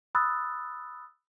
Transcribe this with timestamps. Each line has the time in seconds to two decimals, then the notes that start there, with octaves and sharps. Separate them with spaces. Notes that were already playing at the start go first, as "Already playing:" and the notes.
0.15 B5 D#6 E6 F#6 A6